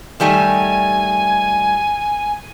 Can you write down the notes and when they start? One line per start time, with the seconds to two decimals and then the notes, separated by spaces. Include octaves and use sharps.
0.20 D#3 G3 A3 G#5